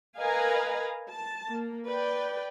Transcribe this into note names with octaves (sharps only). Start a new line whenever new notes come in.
A#4 B4 D#5 F5 G#5 A#5
A5
A#3
B4 D5 G5